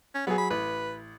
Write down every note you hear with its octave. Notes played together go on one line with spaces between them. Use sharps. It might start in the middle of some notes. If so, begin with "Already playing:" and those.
C#4
F#3 B3 G#4
B5
A1 B4